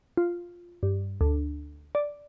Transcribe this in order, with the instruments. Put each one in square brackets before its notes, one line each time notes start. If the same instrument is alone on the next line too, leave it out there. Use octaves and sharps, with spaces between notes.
[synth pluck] F4
G2
D2
D5